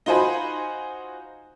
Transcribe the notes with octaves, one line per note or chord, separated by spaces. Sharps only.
D#4 F4 F#4 C5 G#5 B5